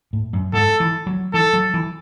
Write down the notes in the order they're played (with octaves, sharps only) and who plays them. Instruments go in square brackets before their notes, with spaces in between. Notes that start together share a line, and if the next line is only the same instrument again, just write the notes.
[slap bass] A2
F#2
[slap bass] G#2 [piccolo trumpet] A4
[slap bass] E3
F#3
[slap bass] E3 [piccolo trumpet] A4
[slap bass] F#3
E3